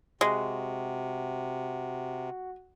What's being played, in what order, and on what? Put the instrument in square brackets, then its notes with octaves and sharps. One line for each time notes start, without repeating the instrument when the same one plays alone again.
[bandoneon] C3 [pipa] G#3 [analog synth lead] F#4